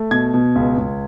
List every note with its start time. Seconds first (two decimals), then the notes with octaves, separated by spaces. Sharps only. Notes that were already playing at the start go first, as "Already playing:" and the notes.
Already playing: A3
0.11 B2 G#6
0.34 B2
0.56 C#2
0.78 C#2